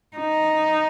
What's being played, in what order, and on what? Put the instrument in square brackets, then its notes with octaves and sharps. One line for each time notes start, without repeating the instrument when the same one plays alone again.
[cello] D#4